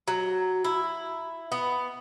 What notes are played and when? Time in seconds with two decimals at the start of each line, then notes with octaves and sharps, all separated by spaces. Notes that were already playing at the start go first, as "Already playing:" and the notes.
0.08 F#3
0.65 E4
1.52 B3